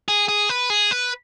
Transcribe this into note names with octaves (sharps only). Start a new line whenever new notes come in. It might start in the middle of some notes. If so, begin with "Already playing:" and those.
G#4
G#4
B4
G#4
B4